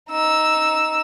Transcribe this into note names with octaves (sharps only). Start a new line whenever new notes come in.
D#4 E6